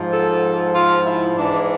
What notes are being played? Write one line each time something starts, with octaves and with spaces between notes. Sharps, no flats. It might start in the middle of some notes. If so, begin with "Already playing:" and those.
Already playing: G#2 F3
A4
F4
E4
G#2 E3 D4